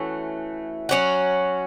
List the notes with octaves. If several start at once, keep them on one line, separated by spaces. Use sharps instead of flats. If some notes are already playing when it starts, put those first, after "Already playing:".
Already playing: E3 A3 C#4 F#4
F#3 C#4 F#4